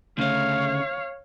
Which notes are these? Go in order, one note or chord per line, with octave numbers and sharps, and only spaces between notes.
D2 C#3 A3 C#5 F5